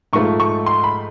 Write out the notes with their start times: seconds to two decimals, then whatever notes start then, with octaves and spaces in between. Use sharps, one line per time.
0.13 G#2 F3 A3 C#6
0.40 C#6
0.66 C6
0.84 B5